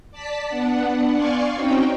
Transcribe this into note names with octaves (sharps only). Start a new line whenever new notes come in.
D5 A5 B6
B3 D4 F#5
D5 F5 G#5 C6 C#6
C4 C#4 D#4 F#4 G5